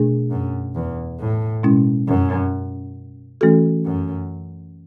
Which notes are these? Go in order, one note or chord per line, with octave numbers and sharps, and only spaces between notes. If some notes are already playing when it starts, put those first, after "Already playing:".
Already playing: B2 A3 D4 G#4
F#2
E2
A2
B2 G#3 C#4 E4
F#2
E3 A3 C#4 F#4 A4
F#2